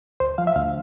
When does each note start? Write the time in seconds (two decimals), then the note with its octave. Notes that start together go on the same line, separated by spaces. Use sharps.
0.20 D2 C5
0.38 F3 F5
0.47 E5
0.55 D2 F5